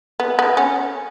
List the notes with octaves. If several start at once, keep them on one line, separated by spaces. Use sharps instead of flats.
B3
B3
C#4